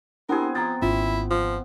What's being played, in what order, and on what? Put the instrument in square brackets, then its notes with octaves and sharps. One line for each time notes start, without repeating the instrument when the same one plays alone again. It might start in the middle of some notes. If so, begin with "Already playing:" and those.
[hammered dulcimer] B3 C4 G#4 [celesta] D4 E4 G4 [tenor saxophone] A#4
[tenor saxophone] F3 [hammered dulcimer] G5 [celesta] A#5 A6
[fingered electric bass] G#1 C#4 [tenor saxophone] E4 [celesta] F4
[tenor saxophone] F3